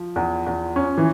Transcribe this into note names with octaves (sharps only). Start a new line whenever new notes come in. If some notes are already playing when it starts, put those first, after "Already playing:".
Already playing: F3
E2
E2
C#4
E3